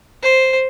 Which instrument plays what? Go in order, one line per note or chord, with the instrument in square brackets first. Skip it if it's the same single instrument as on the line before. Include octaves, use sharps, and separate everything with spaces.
[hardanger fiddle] C5